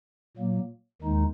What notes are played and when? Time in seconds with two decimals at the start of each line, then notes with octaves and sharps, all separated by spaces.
0.37 A#2 F#3 A#3
1.01 D#2 D#3 G#3 D#4